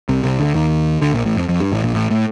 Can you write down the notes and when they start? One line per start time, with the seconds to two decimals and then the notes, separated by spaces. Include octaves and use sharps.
0.09 C2 C3
0.23 C2 C3
0.40 D2 D3
0.54 D#2 D#3
1.01 D2 D3
1.13 A#1 A#2
1.25 A1 A2
1.37 F2
1.48 F2
1.60 G2
1.72 A1 A2
1.84 A#1 A#2
1.94 A1 A2
2.11 A2